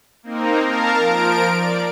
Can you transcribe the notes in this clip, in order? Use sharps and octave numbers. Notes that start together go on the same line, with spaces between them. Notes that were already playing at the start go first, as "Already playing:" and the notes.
A#3 C4 D#4 A#4
A#4 F5 A5 A#5
F3 A#4 D7
D5